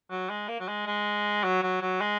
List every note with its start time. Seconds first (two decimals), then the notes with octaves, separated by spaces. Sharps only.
0.11 F#3
0.30 G#3
0.49 A#3
0.60 F#3
0.68 G#3
0.86 G#3
1.44 F#3
1.63 F#3
1.82 F#3
2.01 G#3